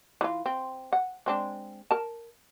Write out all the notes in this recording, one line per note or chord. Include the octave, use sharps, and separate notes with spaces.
E3 F4
C4
F#5
G#3 C4 D4
A#4 A5